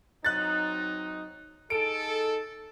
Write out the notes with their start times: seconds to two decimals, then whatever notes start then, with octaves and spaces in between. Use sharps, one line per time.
0.25 F#3 C4 D#4 F#6 A6
1.70 D#4 G#4 A4 D7